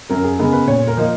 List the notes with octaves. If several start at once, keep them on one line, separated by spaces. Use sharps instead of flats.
F#2 A#4
G#4
C#3 G#3 B3 A#4
B4
A#2 C#5
A#4
F3 A#3 D#4